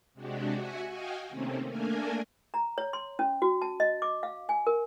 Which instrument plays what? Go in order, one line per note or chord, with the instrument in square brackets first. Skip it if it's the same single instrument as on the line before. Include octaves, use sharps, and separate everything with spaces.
[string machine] C3 G#3 D4 F#4 G4
F#4 E5 F#5 G#5
F#4 D#5 F5 G5 G#5
C3 D#3 A3 A#3 C4 C#4
A3 A#3 D4 A#4 G#5
[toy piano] A#5
C#5
C6
C#4
F#4
A5
D#5
D6
F5
G#5
A#4